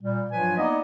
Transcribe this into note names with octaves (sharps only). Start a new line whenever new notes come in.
A#2 G3
G2 F3 F#3 F4 B4 G#5
A#3 B3 D#4 D5 D#5